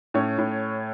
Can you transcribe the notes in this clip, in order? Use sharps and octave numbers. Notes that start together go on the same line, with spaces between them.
A2 C#4 C#5
A2